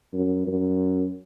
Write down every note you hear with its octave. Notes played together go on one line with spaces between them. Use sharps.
F#2
F#2